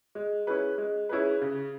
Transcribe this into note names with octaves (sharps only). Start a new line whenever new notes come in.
G#3
C#4 E4 G#4 B4
G#3
C#4 E4 G#4 B4
C#3